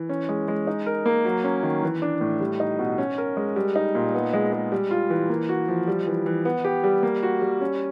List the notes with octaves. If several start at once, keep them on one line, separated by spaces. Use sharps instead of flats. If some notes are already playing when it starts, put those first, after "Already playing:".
Already playing: E3
C#4
G#3
G#3
D#4
A#4
A#3
F#3
C#4
D#3
E3
D4
A2
G3
D#4
B2
C#4
A#4
G#3
G3
D#4
A#2
B3
G#3
G#3
G3
F4
E3
A#3
F#4
F3
G3
E3
E3
B3
G4
G3
A#3
F#4
G3
C#4